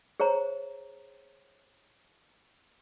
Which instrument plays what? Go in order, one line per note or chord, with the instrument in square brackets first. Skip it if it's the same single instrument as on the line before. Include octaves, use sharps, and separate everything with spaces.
[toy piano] G#4 C5 C#5 A#5